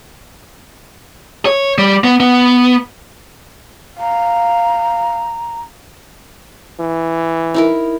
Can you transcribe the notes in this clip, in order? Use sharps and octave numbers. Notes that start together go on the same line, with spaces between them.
C#5
G3
B3
B3
F5 A#5
E3
D#4 E4 A#4